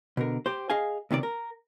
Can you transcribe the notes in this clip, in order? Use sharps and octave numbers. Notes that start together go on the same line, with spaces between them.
B2 D3 A#4
G4 C5
G#4 D#5 F5 G#5
C#2 C3 D#3 D5
A#4